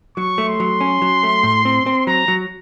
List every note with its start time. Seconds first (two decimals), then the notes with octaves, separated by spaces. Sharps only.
0.17 F#3 C#6
0.38 A3
0.48 C6
0.60 F#3
0.81 C#4
1.02 F#3
1.23 A3
1.43 A2
1.65 C4
1.86 C4
2.07 F#3 A#5
2.28 F#3